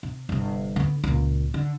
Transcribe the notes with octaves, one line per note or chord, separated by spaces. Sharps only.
C3
G1 C3
D3 B3
C#2 A#2
D3